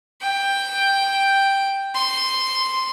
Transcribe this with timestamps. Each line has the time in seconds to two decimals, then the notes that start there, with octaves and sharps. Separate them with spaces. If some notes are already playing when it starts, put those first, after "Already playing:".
0.21 G5
1.95 C6